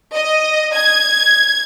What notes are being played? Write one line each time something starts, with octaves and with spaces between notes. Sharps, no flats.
D#5
G#6